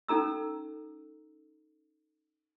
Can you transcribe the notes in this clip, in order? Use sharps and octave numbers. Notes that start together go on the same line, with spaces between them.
C#4 D#4 A4 A#5 E6